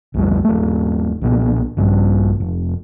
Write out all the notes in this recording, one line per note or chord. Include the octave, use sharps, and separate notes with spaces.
B1 F2 G3
D#1 A3
B1 A#2 B3
A#1 G2 G3
F1